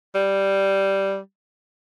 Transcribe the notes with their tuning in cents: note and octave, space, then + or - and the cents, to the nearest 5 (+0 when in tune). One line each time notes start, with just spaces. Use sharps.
G3 -5